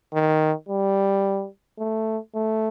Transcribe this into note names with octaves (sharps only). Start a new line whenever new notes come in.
D#3
G3
A3
A3